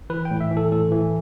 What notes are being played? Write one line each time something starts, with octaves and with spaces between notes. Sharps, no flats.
E3 B4
G5
A2
E5
E3
A4
A2 A4
E3